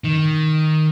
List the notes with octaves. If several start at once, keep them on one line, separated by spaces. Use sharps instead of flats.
D#3